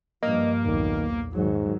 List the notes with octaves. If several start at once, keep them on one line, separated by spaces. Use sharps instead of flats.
G2 F3 A#3 D#5
B1 E2 A#2 D#3
G#2 D#3 F#3